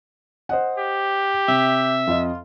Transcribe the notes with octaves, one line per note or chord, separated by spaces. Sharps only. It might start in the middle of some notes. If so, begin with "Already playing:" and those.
C5 D#5 F#5
G4
C3 E5
F2 F4 D#5